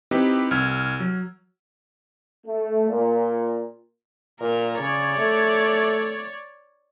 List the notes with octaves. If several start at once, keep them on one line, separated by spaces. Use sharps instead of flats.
C4 D#4 E4 G4 B4
C2 E6 F6 G#6
F#3
A3
A#2
A#2 A#4
C#3 C#5 D5
A3